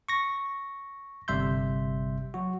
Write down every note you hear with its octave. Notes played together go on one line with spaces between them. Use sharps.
C#6 A#6
G1 C3 G3 E5 C6 G6
F#3 F#4